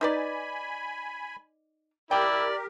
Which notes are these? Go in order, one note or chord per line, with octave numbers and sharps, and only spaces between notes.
D#4 B4 D5 G#5 B5
E4 G4 A#4 D5 G5